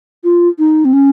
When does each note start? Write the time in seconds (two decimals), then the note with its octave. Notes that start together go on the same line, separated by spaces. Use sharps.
0.24 F4
0.59 D#4
0.85 C4
0.93 C#4